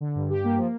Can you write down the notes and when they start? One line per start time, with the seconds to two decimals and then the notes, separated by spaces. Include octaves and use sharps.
0.01 D3
0.15 G2
0.30 G4
0.44 A#3
0.57 F3